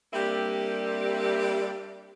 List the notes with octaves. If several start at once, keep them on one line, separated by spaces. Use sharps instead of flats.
G3 A#3 C4 D4 G4 E5